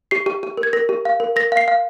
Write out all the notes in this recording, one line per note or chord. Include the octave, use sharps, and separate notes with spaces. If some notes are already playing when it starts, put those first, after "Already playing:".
G4 C7
G4
G4
A#4
G#6
A#4 A#6
G4
F5
A#4
A#4 A#6
F5
C7
F5